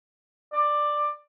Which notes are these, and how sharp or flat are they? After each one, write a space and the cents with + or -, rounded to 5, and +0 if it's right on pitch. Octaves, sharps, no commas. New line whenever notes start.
D5 +10